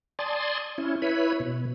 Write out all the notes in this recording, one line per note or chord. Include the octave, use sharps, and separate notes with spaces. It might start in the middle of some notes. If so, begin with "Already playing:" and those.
D5 G#5 A5 C6 D#6
C#4 E4
E4 B4 C#5 B5
B2